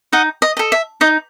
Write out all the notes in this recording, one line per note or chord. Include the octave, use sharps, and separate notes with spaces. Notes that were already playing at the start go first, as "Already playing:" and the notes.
D#4 D#5 F#5
D#5
A4 D#5
E5
D#4 D#5